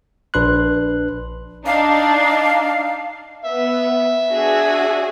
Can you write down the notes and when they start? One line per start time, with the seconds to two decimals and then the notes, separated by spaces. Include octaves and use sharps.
0.34 A#1 D4 B4 C6 F#6
1.66 D4 D#4 F5
3.45 B3 E5
4.30 D4 F#4 G#4